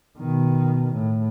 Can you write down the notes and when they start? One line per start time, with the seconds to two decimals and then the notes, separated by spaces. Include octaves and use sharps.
0.18 B2 D#3
0.94 A2